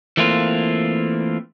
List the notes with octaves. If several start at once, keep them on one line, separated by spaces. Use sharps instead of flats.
E3 A3 A#3 C4 F4